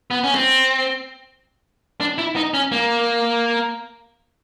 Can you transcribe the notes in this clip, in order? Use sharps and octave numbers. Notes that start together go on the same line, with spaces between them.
B3
C#4
C4
D4
E4
D#4
C#4
A#3